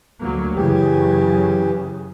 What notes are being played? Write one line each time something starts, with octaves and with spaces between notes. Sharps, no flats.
D2 F#3 A#3
F#2 C#3 E3 G4